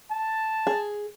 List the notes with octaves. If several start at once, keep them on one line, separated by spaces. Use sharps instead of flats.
A5
G#4